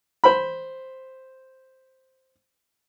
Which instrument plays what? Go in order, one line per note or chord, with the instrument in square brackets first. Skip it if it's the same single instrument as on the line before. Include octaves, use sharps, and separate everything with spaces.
[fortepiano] C5 B5